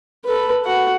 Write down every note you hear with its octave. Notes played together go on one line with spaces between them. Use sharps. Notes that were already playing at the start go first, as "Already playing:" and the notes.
A4 B4
F#4 F#5